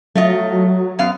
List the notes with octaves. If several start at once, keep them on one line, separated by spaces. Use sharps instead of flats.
F#3 A3 F4 D#5
F#2 B3 F5